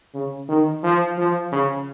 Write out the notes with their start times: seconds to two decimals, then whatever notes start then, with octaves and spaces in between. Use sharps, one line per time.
0.14 C#3
0.49 D#3
0.83 F3
1.18 F3
1.52 C#3